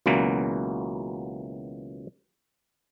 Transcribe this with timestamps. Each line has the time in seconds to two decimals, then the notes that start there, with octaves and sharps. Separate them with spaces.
0.06 C#2 B2 E3 F#3 A#3